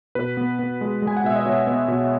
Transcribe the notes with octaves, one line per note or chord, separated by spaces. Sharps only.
B2 B4
B3
B3
G#3
G#3
G#5
F#5
B2 E5
D#5
B2 C#5
B3
B2